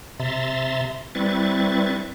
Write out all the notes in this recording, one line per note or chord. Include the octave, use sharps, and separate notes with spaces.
C3 E5 A#5 C6 A6
G3 C4 E4 B4 C#6 A6